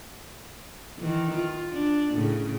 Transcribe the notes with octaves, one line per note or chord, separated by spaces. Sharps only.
D#3 E3
F4
D4
A2 C#3